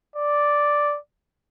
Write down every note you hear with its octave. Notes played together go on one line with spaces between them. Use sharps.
D5